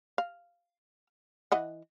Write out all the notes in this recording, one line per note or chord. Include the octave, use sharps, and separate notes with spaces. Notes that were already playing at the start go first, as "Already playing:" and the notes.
F5
E3 D#5 F#5